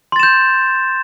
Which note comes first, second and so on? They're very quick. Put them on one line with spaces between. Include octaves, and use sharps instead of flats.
C6 A6 E7 G6